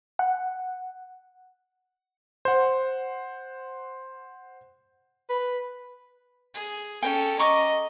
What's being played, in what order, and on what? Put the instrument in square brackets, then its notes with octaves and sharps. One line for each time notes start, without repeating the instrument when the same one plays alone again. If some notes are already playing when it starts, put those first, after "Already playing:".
[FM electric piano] F#5
[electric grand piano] C5 F#5
[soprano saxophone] B4
[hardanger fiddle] G#4
[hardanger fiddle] C#4 A4 [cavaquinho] G5
[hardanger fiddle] D#5 [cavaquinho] A#5 C#6 D6